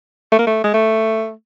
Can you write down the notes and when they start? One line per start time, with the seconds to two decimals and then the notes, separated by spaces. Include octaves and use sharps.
0.32 A3
0.39 A#3
0.46 A3
0.64 G#3
0.74 A3